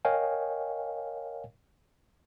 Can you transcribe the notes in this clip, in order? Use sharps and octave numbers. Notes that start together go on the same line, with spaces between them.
A#4 C#5 D#5 F5 G5 G#5